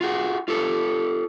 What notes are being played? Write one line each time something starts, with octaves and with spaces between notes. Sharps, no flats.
F4 F#4 G#4
F4 G4 A4